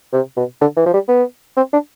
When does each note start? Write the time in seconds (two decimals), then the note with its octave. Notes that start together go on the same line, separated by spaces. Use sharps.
0.13 C3
0.36 B2
0.61 D3
0.77 E3
0.86 F3
0.93 G3
1.08 B3
1.57 C4
1.73 D4